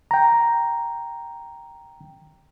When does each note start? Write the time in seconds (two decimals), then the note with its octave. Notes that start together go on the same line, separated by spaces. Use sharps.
0.11 G5 A#5